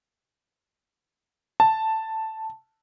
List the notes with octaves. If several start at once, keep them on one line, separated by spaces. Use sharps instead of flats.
A5